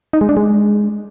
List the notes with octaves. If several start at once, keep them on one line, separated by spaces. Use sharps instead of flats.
D#4
G#3
D4
G#3